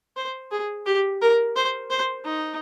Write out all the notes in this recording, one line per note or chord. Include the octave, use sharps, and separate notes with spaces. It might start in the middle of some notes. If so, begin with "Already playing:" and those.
C5
G#4
G4
A#4
C5
C5
D#4